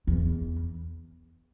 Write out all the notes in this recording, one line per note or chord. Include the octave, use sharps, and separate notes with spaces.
E2